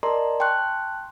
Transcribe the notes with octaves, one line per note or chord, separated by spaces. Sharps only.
A#4 D5 D#5 A5 A#5 C6
G5 A5 C6 C#6 F#6